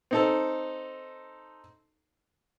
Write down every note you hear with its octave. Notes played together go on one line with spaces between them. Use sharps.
C4 D#4 A4